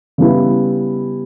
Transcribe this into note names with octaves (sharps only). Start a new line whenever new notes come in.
C#3 G3 B3 E4